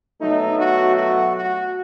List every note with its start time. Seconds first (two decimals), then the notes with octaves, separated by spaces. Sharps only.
0.21 B2 F#3 A3 D#4
0.58 F#4
0.96 F#4
1.34 F#4